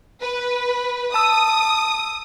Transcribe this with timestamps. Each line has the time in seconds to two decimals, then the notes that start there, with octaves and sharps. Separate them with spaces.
0.21 B4
1.14 A5 D#6 E6